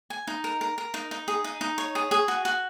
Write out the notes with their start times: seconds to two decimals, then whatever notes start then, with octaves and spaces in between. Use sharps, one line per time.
0.10 G#5
0.27 D#4
0.44 A#4
0.61 A#4
0.78 A#4
0.94 D#4
1.11 D#4
1.28 G#4
1.44 D#4
1.61 D#4
1.78 C#5
1.95 G#4
2.11 G#4
2.28 F#4
2.45 F#4